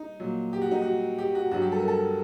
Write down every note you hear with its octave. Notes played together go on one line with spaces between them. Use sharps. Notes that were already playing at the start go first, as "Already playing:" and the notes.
Already playing: D#4
A#2 F#3
G4
F#4
D#4
F#4
G4
F#4
G2 F#3 F#4
G4
A4
A#4
A4